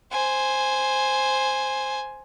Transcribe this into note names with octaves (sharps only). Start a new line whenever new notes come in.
C5 G#5